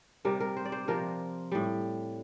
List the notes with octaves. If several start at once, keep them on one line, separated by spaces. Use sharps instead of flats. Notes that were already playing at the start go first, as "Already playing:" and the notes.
C3 G3 A#4
A#4
C5
D5
C5
C3 F3 A#4
A2 G3